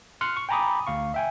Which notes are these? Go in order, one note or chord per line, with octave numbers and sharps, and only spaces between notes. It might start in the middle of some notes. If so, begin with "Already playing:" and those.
C6 F6 F#6 C#7
C#6
G5 G#5 A#5 B5 D6 D#6
D2 F5 C#6
E5 G5 G#5